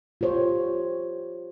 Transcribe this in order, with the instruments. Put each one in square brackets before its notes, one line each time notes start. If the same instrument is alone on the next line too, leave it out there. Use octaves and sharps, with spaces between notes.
[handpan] F4 G4 C5 C#5